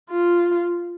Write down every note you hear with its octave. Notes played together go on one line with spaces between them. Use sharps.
F4